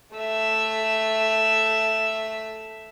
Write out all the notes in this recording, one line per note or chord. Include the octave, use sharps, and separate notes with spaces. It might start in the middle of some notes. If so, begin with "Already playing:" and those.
A3 E5